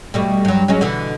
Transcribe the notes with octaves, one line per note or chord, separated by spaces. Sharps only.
B2 G3 A3
G2 F#3
F#3 G#3 C#4
B2 D3 E3